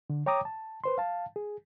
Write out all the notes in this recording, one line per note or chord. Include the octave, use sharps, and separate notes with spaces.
D3
C#5 G5 A#5 D6 D#6
A5
B4 C5 C6
F5 A5
G#4